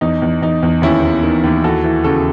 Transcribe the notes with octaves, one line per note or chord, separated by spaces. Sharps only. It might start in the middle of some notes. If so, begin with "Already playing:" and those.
E2 D#4
E2
E2 D#4
E2
D#2 C#4 E4
D#2
D#3
D#2
E3 F#4 A4
E3
C#3 F#4 A4